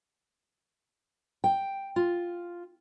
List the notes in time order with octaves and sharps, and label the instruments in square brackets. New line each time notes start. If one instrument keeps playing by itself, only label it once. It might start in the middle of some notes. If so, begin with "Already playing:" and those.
[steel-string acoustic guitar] G5
F4